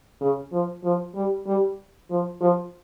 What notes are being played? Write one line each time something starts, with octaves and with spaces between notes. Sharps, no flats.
C#3
F3
F3
G3
G3
F3
F3